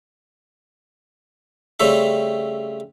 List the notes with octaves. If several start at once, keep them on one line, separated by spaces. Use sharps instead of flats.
C#3 G3 A3 C4 C#4 E5